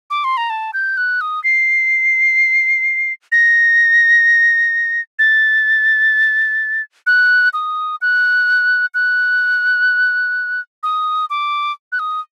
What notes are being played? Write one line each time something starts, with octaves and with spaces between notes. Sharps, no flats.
D6
C6
A#5
A5
G6
F#6
D#6
C7
A#6
A6
F#6
D#6
F#6
F#6
D#6
D6
F#6
D#6